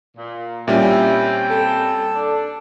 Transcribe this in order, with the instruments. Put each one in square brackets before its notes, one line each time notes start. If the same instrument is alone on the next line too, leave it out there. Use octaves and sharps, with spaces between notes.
[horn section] A#2
[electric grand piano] A#2 G3 C#4 [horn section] C4 G5 [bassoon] E4
[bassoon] A4
[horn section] D4